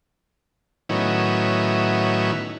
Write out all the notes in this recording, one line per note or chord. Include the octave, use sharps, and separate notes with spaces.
A2 D#3 F#3 B3 C#4 E4